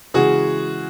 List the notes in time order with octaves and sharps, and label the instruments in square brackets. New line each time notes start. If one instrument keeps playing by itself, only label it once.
[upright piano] C#3 E3 G#3 [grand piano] F#4 G#4